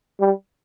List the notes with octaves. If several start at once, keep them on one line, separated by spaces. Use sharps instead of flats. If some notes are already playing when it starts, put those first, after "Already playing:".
G3